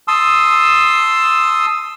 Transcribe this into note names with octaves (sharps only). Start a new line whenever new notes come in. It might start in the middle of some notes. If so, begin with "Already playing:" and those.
A5 C6 D#6 E6